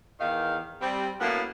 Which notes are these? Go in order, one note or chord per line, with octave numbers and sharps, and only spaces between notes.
E2 D#3 F5
G3 C4
A2 F#3 A#3 B3 C#4 E4